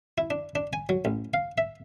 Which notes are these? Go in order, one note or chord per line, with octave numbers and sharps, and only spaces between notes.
E4
D4
D4
G#5
F#3
A1
F5
E5